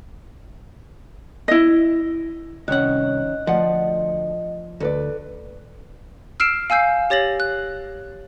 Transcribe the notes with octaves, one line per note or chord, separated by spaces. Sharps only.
E4 D#5
C2 D#3 C#4 D#5 F#5 F#6
D2 F3 D5 D#5 F#5
D2 A4 B4 D5
E6 F6 C7 D7 E7
F5 G#5 E6 G6 C7
G4 C#5 A6 A#6 F#7
F#6